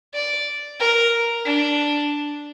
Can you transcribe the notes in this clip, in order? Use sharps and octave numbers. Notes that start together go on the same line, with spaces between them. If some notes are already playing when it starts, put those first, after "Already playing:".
D5
A#4
D4